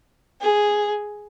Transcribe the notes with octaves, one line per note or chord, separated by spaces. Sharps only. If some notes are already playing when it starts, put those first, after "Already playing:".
G#4